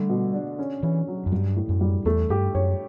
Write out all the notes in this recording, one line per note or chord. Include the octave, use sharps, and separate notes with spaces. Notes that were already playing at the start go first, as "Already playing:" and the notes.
Already playing: D3 G3 A3
B2
D4
C#4
E3 C#4
F#3
F#2
G2 G3
A2
F#2
G3
E2 A3
G2 G4
F#2 C#5